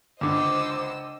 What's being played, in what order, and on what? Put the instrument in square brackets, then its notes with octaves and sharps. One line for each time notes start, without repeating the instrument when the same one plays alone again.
[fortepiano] C#2 D3 [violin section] C5 D#5 E6 [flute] D6